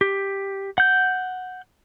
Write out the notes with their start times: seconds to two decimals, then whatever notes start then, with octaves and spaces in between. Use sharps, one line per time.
0.01 G4
0.78 F#5 G6